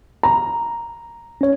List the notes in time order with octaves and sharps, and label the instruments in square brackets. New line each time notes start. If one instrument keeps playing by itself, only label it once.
[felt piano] A#5
[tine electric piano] C#4 C#5